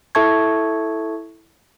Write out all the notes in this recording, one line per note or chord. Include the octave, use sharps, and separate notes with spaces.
E4 A4 E5 A5 C#6 G#6